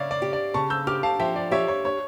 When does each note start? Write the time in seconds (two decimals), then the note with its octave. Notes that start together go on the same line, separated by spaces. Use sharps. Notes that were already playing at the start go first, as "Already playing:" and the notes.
Already playing: C#3 C#5 D5 E5 F5
0.11 D5
0.22 G4
0.33 D5
0.54 C#3 A5 C#6
0.70 E6 G6
0.87 G4 D6 F6
1.03 F5 A5
1.20 F3 E5 G5
1.36 D5
1.51 G4 C#5 E5
1.68 C#5
1.84 D4 C#5